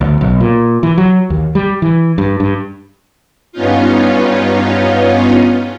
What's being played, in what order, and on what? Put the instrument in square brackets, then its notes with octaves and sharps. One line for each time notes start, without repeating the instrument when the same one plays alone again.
[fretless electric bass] D2
B1
A#2
E3
F#3
D#2
G3
E3
G2
G2
[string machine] G2 B3 C#4 D#4 F4